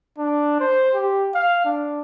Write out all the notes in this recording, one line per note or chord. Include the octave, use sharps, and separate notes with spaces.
D4
C5
G4
F5
D4